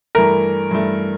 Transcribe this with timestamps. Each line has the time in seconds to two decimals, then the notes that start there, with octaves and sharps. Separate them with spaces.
0.15 G2 E3 A3 A#4
0.71 G2 E3 A3